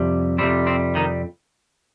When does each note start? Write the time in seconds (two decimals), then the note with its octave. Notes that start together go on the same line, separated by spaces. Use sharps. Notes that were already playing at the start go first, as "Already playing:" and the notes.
Already playing: F2 C3 G3
0.38 F2 C3 G3 C4
0.67 C4
0.95 D#3 D#4